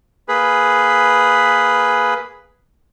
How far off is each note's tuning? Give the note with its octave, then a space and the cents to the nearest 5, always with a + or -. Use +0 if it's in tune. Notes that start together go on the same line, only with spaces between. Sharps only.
A#3 +0 G#4 +0 B4 +0